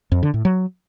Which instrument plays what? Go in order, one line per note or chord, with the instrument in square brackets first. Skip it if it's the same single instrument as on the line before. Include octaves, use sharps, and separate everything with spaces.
[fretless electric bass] F2
D3
A2
F#3